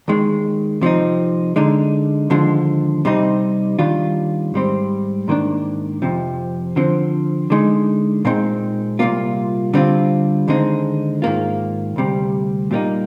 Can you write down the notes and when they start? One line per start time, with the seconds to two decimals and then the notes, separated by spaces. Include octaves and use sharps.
0.08 D#2 D#3 G#3
0.81 C3 F3 C4 D#4
1.56 D3 G#3 D#4
2.30 D#2 D3 F3 G#3
3.05 C3 G3 C4 D#4
3.79 D#2 D#3 G3 D4 F4
4.54 G#2 G3 C4
5.28 G#2 D#3 A#3 D4
6.02 F2 C3 F3
6.76 D3 F3 C4
7.50 D3 G#3 D#4
8.25 A#2 G#3 C4 D#4
8.99 C2 A#2 F3 A#3 F4
9.74 D3 G3 C4 F4
10.48 D#2 D3 G#3 C4 D#4
11.22 G#2 D#3 A#3 F4
11.96 D2 C3 G3
12.71 A#2 G3 A#3 D#4